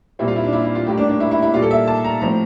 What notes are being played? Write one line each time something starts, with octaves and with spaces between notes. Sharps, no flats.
A#2 G3 C4 E4
F4
E4
D4
E4
E4
F4
A2 G3 A#3 G4
D4
D4
E4
E4
E4
A#2 G3 A#3 F4
A4
E5
A5
A#5
A2 F3 C4 A#5